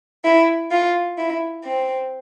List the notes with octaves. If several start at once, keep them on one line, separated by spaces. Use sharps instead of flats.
E4
F4
E4
C4